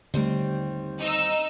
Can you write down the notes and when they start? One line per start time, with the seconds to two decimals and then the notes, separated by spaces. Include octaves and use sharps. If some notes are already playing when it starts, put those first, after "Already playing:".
0.14 D#2 D3 G3 A3 C4
1.01 D#4 E6